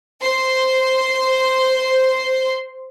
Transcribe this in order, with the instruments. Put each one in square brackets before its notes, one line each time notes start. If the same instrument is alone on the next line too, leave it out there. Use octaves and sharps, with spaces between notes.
[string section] C5 C6